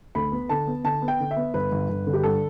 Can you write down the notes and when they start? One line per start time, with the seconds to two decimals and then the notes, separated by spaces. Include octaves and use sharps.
0.15 D2 B5
0.32 B3
0.49 D3 A5
0.67 B3
0.84 D3 A5
1.02 B3
1.08 G5
1.20 D3
1.31 E5
1.37 B3
1.54 G1 B4
1.72 G1
1.89 G1
2.07 D3
2.13 G4
2.23 G2 A4